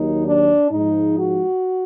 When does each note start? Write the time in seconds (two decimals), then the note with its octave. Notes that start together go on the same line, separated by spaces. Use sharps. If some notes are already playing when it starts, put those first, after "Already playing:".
Already playing: D#2 D#3 F#3 D#4
0.26 D4
0.70 G#2 F3 D#4
1.16 F#4